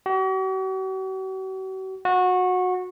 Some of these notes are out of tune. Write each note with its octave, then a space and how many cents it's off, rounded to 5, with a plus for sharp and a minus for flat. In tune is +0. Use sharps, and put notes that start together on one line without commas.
F#4 +45
F#4 -20